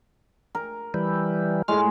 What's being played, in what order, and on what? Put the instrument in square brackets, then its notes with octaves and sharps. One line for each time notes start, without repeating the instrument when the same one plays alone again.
[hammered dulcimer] A#4
[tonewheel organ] E3 G3
[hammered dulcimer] A2 G#3 [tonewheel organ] F6